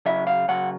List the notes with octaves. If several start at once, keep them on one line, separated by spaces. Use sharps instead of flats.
C#3 F#3 E5
F5
C#3 F#3 F#5